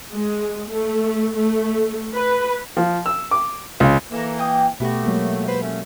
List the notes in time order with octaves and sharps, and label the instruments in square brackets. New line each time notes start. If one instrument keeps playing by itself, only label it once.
[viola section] G#3
A3
A3
B4
[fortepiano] F3
E6
D6
C#2
[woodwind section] E3 A#3 [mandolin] A4 A#4
[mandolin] G5 D#6
[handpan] B2 G4 [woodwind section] A3 [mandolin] B3 F#4
[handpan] F#3 G#3 A#3
[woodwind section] B4 C5
A3 C#4